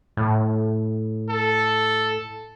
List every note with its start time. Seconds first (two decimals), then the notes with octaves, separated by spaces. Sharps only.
0.17 A2
1.29 A4